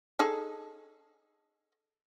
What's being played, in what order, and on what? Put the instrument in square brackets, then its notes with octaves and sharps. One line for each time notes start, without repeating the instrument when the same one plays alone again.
[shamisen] D#4 G#4 A4